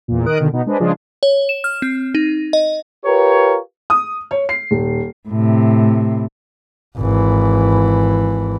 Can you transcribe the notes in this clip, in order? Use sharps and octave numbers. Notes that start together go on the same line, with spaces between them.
E2 A#2
D#3 A#4 D#6 F#6 D7
B2 D3 D#3
B2 B3 D#4
G#3 D4 B4 C5 D#5
C#3 F3 G#3 D4 F4 G#4
C#5
E7
F6
C4
D#4
D#5
F4 G4 A#4 B4 C#5
D#6
C#5
C7
D#1
A2 C3
G#1 E3